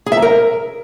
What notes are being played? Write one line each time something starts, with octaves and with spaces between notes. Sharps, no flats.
G#4
E5
A#5
A#4